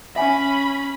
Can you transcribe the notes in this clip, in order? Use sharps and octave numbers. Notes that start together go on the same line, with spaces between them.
C#4 E5 G#5 B5